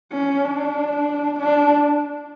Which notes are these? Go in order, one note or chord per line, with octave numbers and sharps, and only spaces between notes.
C#4
D4
D4